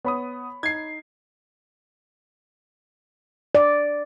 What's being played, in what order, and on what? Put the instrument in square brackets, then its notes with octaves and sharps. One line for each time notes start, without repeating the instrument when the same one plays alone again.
[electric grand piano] B3 D#6 [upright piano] C#5 B5
[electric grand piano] D#4 [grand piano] G#6 C7
[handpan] D5